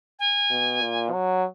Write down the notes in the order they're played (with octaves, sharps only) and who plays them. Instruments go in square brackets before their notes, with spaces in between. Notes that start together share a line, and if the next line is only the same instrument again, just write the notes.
[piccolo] G#5
[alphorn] B2
A#2
F#3